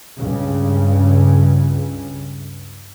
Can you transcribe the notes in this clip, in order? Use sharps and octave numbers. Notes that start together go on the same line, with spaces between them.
C#2 G2 C#3